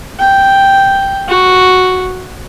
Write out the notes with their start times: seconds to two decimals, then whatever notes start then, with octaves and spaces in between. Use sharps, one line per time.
0.20 G5
1.29 F#4